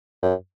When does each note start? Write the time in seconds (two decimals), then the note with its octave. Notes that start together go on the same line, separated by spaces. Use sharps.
0.23 F#2